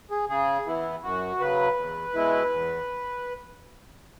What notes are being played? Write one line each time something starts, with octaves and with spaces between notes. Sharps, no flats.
G#4
C#3 G#4
E3 B3 E4
F#2 F#4
C#3 F#3 B4
E2
B2 G#3 E4
E2